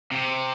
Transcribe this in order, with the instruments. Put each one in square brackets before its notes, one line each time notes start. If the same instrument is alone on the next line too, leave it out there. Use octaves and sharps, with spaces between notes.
[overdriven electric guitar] C3